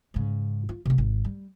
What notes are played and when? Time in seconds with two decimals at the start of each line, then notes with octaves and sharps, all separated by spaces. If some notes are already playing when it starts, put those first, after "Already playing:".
0.14 G#2 C#3
0.69 F4
0.86 C3 B3
0.98 G#1
1.24 G3